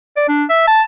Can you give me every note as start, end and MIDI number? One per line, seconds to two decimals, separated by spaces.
0.16 0.25 74
0.29 0.44 62
0.49 0.66 76
0.67 0.82 81